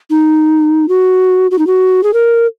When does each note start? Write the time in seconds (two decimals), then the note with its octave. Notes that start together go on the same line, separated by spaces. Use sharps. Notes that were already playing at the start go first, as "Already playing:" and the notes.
0.10 D#4
0.89 F#4
1.51 F#4
1.59 D#4
1.67 F#4
2.03 G#4
2.13 A#4